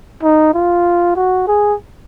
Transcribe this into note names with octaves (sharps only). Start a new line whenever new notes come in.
D#4
F4
F#4
G#4